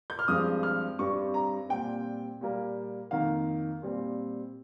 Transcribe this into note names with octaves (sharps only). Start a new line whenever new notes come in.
G6
F6
G2 F3 G#3 C4 D#6
F6
G2 G3 C4 C#6
A#5
A#2 G3 C4 G5
A#2 G3 A#3
F2 D#3 A#3 F5
A#2 G3 C4